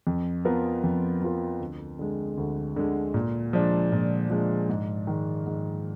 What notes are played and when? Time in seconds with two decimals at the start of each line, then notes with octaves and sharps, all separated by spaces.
0.07 F2
0.45 F3 B3 F4 A#4
0.84 F2
1.22 F3 B3 F4 A#4
1.60 D2
1.99 D3 G#3
2.38 D2
2.76 D3 G#3
3.14 A#2
3.53 F3 G#3 D4
3.92 A#2
4.30 F3 G#3 D4
4.69 G#2
5.07 D#3 G#3
5.46 G#2